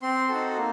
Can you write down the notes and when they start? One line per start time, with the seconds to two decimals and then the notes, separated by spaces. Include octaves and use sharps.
0.02 C4 C6
0.29 D#4 F#4 A4
0.57 A#3